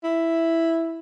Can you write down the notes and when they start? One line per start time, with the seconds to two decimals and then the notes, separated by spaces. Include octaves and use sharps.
0.04 E4